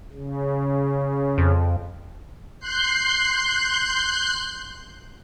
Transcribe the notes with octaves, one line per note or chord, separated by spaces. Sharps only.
C#3
F2
C6 F#6 G6 C7